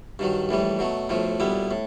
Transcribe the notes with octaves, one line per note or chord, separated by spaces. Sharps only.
G2 D#3 F#3
A#1 A2 E3 G3
B2 F#3 A3
B1 A2 F3 A3
B1 A#2 G3 B3 E4
A2